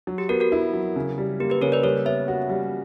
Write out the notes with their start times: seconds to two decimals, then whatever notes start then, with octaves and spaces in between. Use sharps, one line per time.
0.07 F#3
0.18 G4
0.29 B3 F#4 A#4
0.40 F#4 A#4
0.52 E4
0.73 F#3
0.96 C#3
1.18 G3
1.40 A#3 G4
1.50 G4 B4
1.61 C#3 A#4 C#5
1.72 B4 D5
1.83 G3 A#4 C#5
2.05 B3 C#5 E5
2.28 F#4
2.49 G3